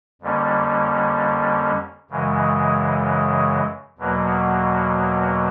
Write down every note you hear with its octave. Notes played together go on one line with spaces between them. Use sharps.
F2 D3 G3 A#3 C#4
F#2 C#3 E3 G#3
E2 B2 F#3 A#3